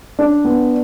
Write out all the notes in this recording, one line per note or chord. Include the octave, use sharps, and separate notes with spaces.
D4
B3